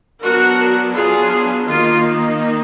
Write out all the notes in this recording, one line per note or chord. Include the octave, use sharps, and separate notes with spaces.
F#3 B3 D4 F#4 A#4
F4 G#4
D#3 A#3 D#4 F4